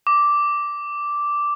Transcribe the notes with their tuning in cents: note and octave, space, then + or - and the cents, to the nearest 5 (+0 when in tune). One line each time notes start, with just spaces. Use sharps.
D6 -5